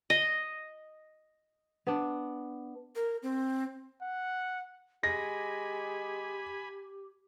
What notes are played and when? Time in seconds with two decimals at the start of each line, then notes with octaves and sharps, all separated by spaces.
0.10 D#5
1.87 B3 D4
2.96 A#4
3.23 C4
4.02 F#5
5.03 G#3 G4 G#5 B5 A#6